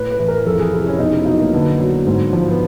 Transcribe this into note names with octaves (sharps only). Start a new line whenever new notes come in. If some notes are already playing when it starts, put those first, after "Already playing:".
Already playing: A2 B4
B4
E3
A#4
F2 A4
G#4
C3 E4
C#4
B2 D#4
E4
F#3 D#4
A#3
D3 B3
F#3
G#2
F3
B3